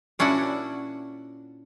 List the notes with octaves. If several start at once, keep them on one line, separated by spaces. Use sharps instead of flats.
A#2 C#4 D4 E4 F#4 F#5